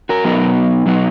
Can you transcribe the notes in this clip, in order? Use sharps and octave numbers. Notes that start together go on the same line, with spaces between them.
F#4 A#4
B2 F#3 B3 D#4
B2 F#3 B3 D#4